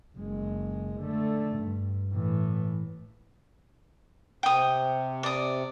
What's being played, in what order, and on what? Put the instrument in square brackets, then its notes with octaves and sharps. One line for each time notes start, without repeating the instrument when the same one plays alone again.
[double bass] F#1 G#3
D3 A3
G2
A2 E3
[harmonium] C3 [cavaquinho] G5 D#6
[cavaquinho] D5 D#6